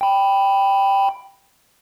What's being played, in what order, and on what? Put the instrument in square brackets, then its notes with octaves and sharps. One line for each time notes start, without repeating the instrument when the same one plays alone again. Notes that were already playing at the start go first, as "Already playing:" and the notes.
[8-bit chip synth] G5 B5